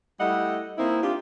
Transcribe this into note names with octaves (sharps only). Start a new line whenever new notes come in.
G3 A3 E4 D#5 F#5
A#3 C4 D#4 E4
D4 F4 G4